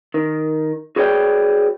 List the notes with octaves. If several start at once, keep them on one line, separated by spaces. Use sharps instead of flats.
D#3
F#4 G#4 B4 C#5 D5 G5